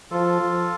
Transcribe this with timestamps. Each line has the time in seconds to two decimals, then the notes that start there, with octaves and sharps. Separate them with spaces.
0.11 F3 F4 A4
0.41 F3